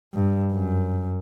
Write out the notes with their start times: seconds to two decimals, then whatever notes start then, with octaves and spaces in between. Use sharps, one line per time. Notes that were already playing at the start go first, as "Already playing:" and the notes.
0.14 G2
0.53 F#2